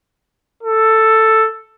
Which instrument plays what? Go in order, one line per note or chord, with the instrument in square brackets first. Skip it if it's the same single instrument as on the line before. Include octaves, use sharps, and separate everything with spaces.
[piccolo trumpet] A4